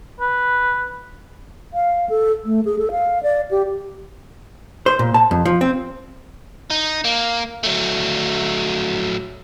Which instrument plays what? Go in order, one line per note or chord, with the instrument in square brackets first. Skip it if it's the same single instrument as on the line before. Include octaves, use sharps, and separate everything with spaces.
[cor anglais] B4
[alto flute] F5
A4
A3
G#4
A4
F5
D5
G4
[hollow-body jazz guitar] C5
A#2
A5
F2
F3
C4
[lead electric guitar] D#4
A#3
F#3 A3